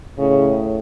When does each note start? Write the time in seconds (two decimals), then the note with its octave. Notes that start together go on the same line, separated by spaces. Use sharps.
0.18 A2 C#3